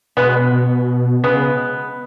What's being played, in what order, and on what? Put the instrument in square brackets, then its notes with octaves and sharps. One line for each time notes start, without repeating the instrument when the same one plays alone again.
[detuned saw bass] B2 [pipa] G#3 B3
[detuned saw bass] B2
[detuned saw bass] C#3 [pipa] G#3 B3